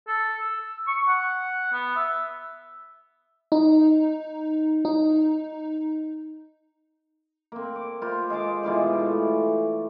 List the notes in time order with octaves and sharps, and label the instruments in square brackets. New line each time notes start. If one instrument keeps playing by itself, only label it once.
[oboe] A4
E6
C#6
F#5
B3
E5
[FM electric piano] D#4
D#4
[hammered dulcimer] A#3 C4
D6
A#3 F4 C5
G#3 G#4 A5 D6
B2 E3 F4 D5
A3